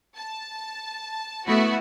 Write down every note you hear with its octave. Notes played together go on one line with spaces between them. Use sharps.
A5
A3 B3 E4 F#4